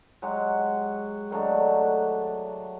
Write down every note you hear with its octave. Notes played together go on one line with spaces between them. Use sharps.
F#3 G#3 G4 F#5
D#3 F#3 A3 D4